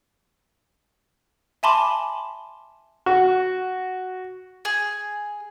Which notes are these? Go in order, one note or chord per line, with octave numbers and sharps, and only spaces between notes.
E5 G#5 A5 B5 C6 D6
F#4
G#4